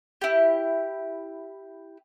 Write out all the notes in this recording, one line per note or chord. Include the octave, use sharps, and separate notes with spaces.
E4 G4